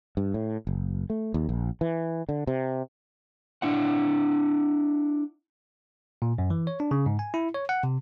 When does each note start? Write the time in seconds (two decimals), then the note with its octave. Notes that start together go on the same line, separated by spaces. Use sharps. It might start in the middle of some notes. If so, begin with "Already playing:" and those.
0.17 G2
0.34 A2
0.67 F#1
1.10 A3
1.34 D#2
1.49 A#1
1.81 E3
2.29 D3
2.47 C3
3.62 D4 E4 F#5
6.22 A#2
6.38 F#2
6.50 E3
6.67 C#5
6.80 D4
6.91 C#3
7.06 G#2
7.19 G#5
7.34 E4
7.54 C#5
7.69 F#5
7.83 C3